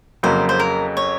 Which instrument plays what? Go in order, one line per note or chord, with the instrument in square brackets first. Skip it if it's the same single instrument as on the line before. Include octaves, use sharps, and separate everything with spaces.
[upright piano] F2 C#3 F#3 A#3 [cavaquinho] C5
[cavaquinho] C5
A#4
C#5